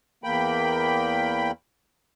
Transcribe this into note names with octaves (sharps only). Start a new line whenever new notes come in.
E2 A#3 G5 B5